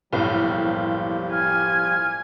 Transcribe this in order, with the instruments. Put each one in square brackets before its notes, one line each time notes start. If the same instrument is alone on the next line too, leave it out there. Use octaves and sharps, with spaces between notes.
[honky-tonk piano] F#1 B1 A2 [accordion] F3 G3
[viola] G#5 [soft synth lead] F6